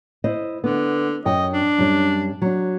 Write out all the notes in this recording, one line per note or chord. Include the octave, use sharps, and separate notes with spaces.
E4 C5 D#5
D3 B3
F#2 D#5 G5
D4
F#2 G3
F#3 D4